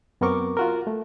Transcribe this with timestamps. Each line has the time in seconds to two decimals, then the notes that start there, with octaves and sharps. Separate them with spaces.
0.21 F#2 B3 C4 A#4 C#6 D6
0.57 F4 F#4 A#4
0.87 A3